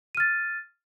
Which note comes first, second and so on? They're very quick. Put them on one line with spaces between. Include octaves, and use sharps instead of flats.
D#7 F6 A6